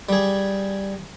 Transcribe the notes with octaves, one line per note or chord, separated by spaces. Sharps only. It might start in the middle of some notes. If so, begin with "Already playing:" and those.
G3 G#4